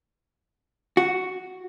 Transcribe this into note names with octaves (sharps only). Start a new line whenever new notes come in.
F#4